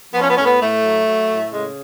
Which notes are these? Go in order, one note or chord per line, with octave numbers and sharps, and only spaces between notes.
F3 B3
C#4
B3
A2 C#4
B3
A2 A3
F#3
F#3
A2
C#3 G#3